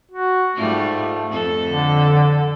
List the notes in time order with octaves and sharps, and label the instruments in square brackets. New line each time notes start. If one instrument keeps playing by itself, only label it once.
[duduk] F#4
[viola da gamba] G#2 G3 F4 [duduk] A3
[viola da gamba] F2 A4
[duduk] D3